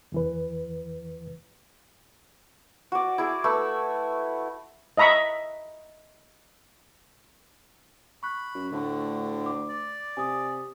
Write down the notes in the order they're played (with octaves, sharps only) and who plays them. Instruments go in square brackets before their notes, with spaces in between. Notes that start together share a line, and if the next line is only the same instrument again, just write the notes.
[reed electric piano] E2 E3 B4
[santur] F#4 D5
E4 G#4
A3 B4 C#6 E6
[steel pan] D#5 E5 A#5 B5 C#6
[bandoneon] B5 [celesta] C#6 F#6
[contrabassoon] F#2
[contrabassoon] D2 [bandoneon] A2 D3
[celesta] D6
[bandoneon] D5
[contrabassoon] C3 [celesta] G#5 D#6